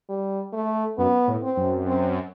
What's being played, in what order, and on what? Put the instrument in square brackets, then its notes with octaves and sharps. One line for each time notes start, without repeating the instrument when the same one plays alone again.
[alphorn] G3
A3
[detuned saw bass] F#2 [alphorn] B3
[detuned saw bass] A2
[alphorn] C4
[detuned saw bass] F#2
[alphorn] C4